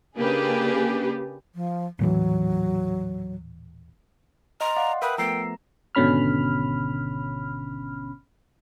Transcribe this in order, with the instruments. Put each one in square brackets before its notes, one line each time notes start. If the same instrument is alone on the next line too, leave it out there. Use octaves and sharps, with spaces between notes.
[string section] C#3 A#3 D4 G4 G#4 B4
[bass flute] F3
[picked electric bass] D#1 A2 E3 [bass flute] F#3
[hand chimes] D#5 C6 [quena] A#5
[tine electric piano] D5 [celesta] F5 [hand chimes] F#5
[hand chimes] A#4 [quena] B4 [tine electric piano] E5 G5 D#6
[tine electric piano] F3 A3 B3 [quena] G5 [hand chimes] A#5 [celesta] E6 C7
[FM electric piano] G#1 B2 D3 C#4 B5 F6